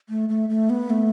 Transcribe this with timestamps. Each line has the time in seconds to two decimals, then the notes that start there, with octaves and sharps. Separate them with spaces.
0.09 A3
0.29 A3
0.49 A3
0.70 B3
0.90 A3